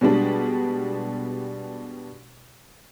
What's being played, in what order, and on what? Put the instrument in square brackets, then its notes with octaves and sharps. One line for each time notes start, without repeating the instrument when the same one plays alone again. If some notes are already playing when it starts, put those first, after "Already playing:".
[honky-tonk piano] B2 G3 G#3 D4